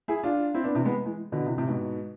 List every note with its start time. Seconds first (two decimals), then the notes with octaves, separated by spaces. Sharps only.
0.08 E4 G#4
0.23 D4 F4
0.54 C4 E4
0.64 B3 D4
0.75 C3 E3
0.85 G#3 B3
1.06 E3 G#3
1.32 B2 D3
1.47 C3 E3
1.57 A2 C3
1.68 G#2 B2